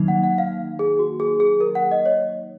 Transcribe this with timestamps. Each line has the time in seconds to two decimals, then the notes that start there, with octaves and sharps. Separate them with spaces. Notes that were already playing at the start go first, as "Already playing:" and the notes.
Already playing: D#3 F#3 A#3 D#4
0.08 F#5
0.23 F#5
0.38 F5
0.79 G#4
0.99 F#4
1.20 G#4
1.40 G#4
1.61 A#4
1.75 F#5
1.91 D#5
2.06 C#5